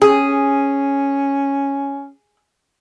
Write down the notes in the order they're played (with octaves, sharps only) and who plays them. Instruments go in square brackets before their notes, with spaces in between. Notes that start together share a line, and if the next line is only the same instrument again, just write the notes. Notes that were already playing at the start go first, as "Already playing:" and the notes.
[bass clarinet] C#4 [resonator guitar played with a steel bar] G#4